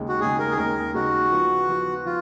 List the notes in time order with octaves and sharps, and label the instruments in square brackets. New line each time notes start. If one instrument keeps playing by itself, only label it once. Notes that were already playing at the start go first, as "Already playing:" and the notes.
Already playing: [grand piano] D#2 C#3 G#3 D#4
[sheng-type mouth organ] F#4
[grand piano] D#2 C#3 G#3 D#4 [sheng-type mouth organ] G#4
[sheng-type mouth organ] A#4
G#4
[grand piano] D#2 C#3 G#3 D#4 [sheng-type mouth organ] A#4
[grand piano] D#2 C#3 G#3 D#4 [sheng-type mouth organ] F#4
[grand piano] F3 B3 F4
F3 B3 F4
[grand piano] F3 [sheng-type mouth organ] F4